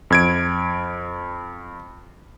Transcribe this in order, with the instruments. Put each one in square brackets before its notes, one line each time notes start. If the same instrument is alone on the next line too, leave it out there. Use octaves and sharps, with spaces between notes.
[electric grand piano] F2 G#6 D7